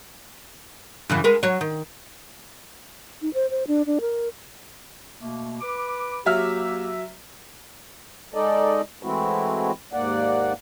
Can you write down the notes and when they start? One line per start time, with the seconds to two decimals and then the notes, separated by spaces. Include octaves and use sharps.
1.09 F#2 C#3 E3
1.24 G#3 A#4 B4
1.43 F#3 C#5
1.61 D#3
3.22 D#4
3.34 C5
3.50 C5
3.67 D4
3.86 D4
4.01 A#4
5.21 B2 A3 A#3
5.61 B4 D6
6.26 F#3 A#3 G4 E5 F6
8.34 G#3 D#4 A4 D5 D#5
9.03 E3 G#3 A3 C4 E4 F#4
9.93 D#2 G#2 A#3 D5 F#5